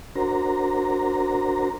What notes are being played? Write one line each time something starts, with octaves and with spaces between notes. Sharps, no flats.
D4 F#4 A#4 C5 A#5